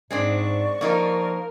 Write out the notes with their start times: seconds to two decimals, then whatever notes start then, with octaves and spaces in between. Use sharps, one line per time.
0.11 G#2 G#3 C4 D4 D5 C#6
0.81 F3 A#3 D#4 F4 A#4